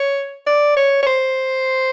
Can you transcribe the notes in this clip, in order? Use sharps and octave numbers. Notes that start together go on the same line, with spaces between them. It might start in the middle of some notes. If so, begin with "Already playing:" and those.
Already playing: C#5
D5
C#5
C#5
C5